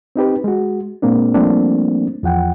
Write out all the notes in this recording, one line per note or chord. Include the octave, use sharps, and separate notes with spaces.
C4 D#4 G4 B4
G#3 F#4
A#2 G#3 A#3 C4 D4
F3 G3 A3 A#3 C4 D4
E2 F3 F#5 G5